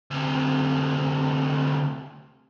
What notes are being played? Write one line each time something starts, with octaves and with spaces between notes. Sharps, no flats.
D2 C3